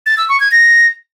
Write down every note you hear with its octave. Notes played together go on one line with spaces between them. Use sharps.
A6
E6
C#6
G#6
A#6